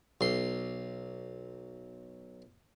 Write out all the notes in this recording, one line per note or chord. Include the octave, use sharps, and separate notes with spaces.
B1 C6